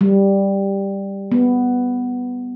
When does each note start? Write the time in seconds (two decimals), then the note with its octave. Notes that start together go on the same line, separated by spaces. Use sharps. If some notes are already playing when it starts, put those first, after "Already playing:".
0.01 G3
1.32 B3